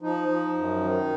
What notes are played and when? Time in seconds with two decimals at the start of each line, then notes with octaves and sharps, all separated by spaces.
0.02 F3 D#4
0.28 F3
0.55 F#2
0.81 D#3